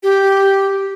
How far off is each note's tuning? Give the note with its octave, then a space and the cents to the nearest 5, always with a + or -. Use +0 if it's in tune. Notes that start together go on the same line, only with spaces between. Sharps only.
G4 -5